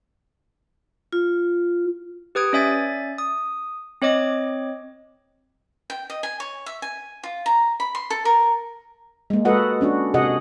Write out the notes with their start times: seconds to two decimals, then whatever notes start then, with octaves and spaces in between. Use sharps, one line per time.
1.13 F4
2.35 G4 B4 D#6 G#6 D7
2.53 C#4 D5 E5 G#5 G#6 A6
3.18 D#6
4.02 C4 C#5 D#5 D6
5.90 G5
6.10 D#5
6.23 G#5
6.40 C#5
6.66 E5
6.82 G#5
7.23 F4
7.46 A#5
7.80 B5
7.95 C6
8.10 A4
8.25 A#4
9.30 G#3 A#3
9.45 G#3 F#4 A4 B4 D#5 F#5
9.81 C#4 D4 F#4
10.14 C3 F#4 G#4 D#5 F#5